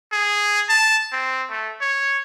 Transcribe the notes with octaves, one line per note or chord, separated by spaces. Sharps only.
G#4
A5
C4
A3
C#5